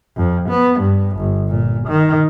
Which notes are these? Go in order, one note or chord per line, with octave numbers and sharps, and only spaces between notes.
F2
B3
G2
G1
A#2
D#3